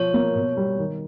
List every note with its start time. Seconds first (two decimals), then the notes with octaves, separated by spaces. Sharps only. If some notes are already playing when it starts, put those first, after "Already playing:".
Already playing: B2 F3 C#5
0.14 A#3
0.35 B2
0.57 G3
0.78 D#3